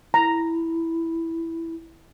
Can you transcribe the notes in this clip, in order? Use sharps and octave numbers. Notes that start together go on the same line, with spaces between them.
E4 A#5